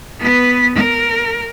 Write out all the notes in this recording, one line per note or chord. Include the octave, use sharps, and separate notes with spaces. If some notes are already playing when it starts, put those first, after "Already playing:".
B3 B4
A#4